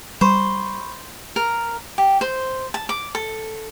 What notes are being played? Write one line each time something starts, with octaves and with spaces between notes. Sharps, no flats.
G3 C5 B5 C#6
A#4
G4
C5
A5
D6
A4